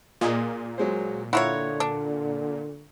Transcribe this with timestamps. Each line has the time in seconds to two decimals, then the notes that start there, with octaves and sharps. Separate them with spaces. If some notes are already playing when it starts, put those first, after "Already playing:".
0.21 A#2 G#4 D#5 G#5
0.78 F#3 G#3 C5
1.33 D3 E4 F4 C#5 F#5 A#5 C#6
1.80 D4